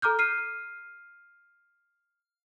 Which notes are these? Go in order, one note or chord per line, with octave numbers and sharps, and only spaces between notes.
A4 A#5 D6 F6 G6
F6 C7 D#7